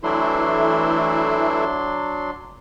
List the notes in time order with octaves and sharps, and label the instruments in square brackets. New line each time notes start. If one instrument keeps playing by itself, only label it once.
[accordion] E3 A3 E4 [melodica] F#3 D4 C6